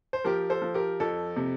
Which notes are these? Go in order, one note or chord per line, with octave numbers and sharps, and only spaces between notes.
C5
F3 G4 A#4
A4 C5
F3
G4 A#4
F2 A4
C3